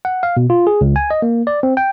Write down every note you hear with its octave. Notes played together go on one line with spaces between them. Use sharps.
F#5
F5
B2
F4
G#4
C#2
G#5
D#5
A#3
D5
C4
G5